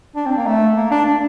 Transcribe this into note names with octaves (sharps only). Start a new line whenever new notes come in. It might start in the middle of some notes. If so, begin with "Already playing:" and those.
D4
C4
A#3
A3
A#3
D4
D4